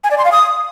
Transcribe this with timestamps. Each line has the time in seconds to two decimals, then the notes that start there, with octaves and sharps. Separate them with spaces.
0.04 G#5
0.11 D5
0.18 C6
0.25 F5
0.32 D#6